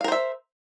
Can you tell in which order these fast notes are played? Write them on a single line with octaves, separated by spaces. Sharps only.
F5 A#4 C5 E5